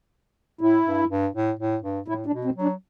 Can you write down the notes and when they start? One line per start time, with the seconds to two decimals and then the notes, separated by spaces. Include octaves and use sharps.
0.61 A2 E4
0.86 G2
1.10 G2
1.35 A2
1.59 A2
1.83 G2
2.08 A2 E4
2.26 D4
2.32 B2
2.45 C4
2.56 F#3
2.62 D4